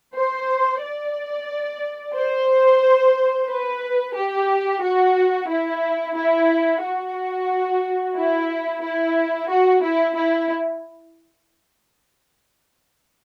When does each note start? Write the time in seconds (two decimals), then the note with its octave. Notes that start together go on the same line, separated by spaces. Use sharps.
0.15 C5
0.82 D5
2.15 C5
3.48 B4
4.15 G4
4.81 F#4
5.49 E4
6.16 E4
6.82 F#4
8.16 E4
8.82 E4
9.49 F#4
9.82 E4
10.15 E4